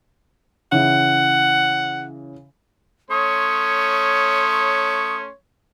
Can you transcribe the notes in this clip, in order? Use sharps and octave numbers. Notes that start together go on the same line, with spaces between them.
C#3 E3 F#5
A3 C#4 C#5 C6 D#6